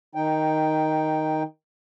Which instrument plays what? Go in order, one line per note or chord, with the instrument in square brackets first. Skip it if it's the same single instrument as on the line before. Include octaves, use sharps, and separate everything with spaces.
[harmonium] D#3 D#4 G5